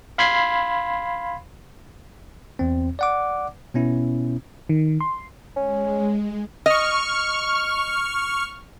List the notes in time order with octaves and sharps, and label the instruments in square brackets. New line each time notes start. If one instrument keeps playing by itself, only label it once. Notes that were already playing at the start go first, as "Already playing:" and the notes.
[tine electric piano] F5 B5 C6 G#6 C7
E2 C4
D5 F#5 D6
B2 B3 C#4 E4
[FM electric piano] D#3
C6
[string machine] G#3 [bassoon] C#4
[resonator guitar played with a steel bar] D#5 [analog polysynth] C#6 F6